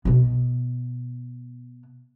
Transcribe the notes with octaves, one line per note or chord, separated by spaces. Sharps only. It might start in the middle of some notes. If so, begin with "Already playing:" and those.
B2 B3